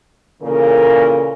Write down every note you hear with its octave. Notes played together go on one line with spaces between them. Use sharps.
A#2 C#3 E3 A4 A#4